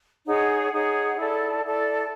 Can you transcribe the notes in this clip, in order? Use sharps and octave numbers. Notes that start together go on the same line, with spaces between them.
D#4 G#4 C#5 F#5
D#4 G#4 C#5 F#5
E4 A4 D5
E4 A4 D5